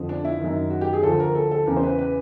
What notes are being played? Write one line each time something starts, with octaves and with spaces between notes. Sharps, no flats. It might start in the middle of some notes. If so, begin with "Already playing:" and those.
Already playing: F2 D3 F3
D4
E4
F#2 D#3
F#4
G4
G#4
D2 D3 F3 A4
A#4
A4
A4
E2 C#3 E3 A#4
C5
B4
B4